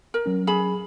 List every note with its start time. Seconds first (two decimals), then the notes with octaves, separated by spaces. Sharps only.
0.14 A#4
0.26 F#3 C#4
0.47 G#4 B5